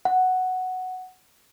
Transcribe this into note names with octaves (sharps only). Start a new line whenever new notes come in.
F#5